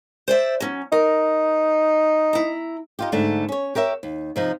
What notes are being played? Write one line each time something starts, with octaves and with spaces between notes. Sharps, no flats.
C5 D5 E5
F#3 C#4
D#4 A#4
E4 A#5
D#4 F4 G4
G#2 D3 A3 D4
C#4 C#5
G4 A#4 C#5 E5
D#2
C3 F3 D#4